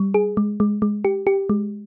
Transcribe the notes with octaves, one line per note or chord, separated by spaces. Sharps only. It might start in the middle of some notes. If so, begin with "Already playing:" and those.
Already playing: G3
G#4
G#3
G#3
G#3
G4
G4
G#3